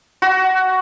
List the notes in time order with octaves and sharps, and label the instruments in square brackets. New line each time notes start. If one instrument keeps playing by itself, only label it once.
[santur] F#4